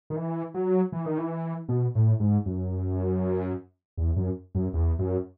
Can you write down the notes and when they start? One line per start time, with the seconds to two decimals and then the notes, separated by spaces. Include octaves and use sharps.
0.10 D#3
0.16 E3
0.54 F#3
0.92 E3
1.06 D#3
1.18 E3
1.69 B2
1.95 A2
2.20 G#2
2.46 F#2
3.97 E2
4.16 F#2
4.55 F#2
4.73 E2
4.99 F#2